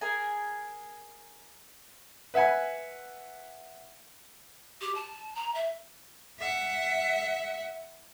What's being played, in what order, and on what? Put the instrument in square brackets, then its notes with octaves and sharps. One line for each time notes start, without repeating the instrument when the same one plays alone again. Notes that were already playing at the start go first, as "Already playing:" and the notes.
[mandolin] G#4 A#4 G#5
[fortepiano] B4 E5 F#5 G#5 B5
[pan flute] G4
A5
A#5
E5
[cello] E5 F#5